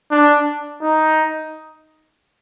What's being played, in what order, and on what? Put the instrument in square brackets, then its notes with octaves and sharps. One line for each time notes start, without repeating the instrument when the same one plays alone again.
[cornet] D4
D#4